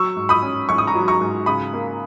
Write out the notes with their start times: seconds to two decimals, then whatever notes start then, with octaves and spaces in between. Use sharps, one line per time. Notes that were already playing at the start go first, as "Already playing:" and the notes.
Already playing: F#3 C#6 E6
0.17 G#2
0.29 B5 D#6
0.42 C#4
0.69 G#2 C#6
0.78 D#6
0.87 A#5 C#6
0.95 F#3
1.08 A#5 C#6
1.21 G#2
1.46 C#3 B5 D#6
1.73 A#3